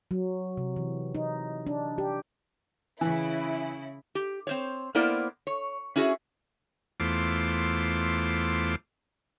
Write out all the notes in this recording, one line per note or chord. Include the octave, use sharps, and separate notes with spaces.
F#3
C3
E3
D#4
D4
G4
C#3 E3 E4
G4
C4 C5 C#5
A#3 B3 E4 A#4 C5 D5
C#5
C#4 E4 F#4 G#4
E2 A3 F4 C5 D6